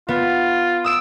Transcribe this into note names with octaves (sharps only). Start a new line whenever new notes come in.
B3 F4
D#6 E6 D7